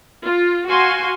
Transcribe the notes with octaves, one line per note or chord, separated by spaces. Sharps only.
F4
F#4 F5 G#5 C6